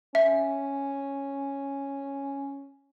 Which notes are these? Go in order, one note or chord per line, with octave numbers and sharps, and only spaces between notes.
C#4 E5